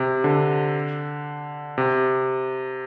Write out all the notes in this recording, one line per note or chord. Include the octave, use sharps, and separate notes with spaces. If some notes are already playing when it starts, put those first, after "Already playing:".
Already playing: C3
D3
C3